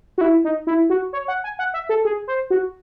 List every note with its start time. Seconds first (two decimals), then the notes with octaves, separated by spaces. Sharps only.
0.18 F#4
0.21 E4
0.44 D#4
0.67 E4
0.90 F#4
1.13 C#5
1.28 F#5
1.44 G#5
1.59 F#5
1.74 E5
1.89 A4
2.05 G#4
2.28 C5
2.50 F#4